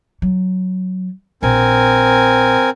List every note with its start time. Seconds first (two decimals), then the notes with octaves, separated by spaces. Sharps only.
0.22 F#3
1.43 A#1 C4 A#4 G#5